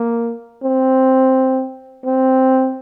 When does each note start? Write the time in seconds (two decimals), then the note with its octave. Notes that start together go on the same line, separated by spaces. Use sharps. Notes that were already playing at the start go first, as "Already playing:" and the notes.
Already playing: A#3
0.63 C4
2.05 C4